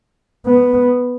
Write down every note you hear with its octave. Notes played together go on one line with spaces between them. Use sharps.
B3